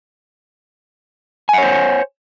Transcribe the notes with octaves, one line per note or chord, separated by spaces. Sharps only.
C5 C#5 F#5 G#5